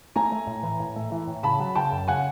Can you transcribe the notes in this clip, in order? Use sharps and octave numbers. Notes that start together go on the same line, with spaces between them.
A3 G#5 A#5
A3
A2
E3
A2
A3
E3
A2
C#3 A5 B5
F#3
C#3 G5 A5
F#2
C#3 F#5 G#5